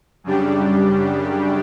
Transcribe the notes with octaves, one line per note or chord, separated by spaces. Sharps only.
F#2 C#3 G3 D4 G4